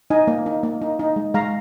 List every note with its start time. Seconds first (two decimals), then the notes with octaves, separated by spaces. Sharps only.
0.10 D#4 D#5 G#5
0.27 A#3
0.46 D#4
0.63 A#3
0.82 D#4
0.99 D#4
1.16 G#3
1.34 G#3 F5 A#5